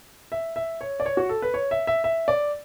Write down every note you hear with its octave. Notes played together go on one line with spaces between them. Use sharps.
E5
E5
C#5
D5
C#5
F#4
A4
B4
C#5
E5
E5
E5
D5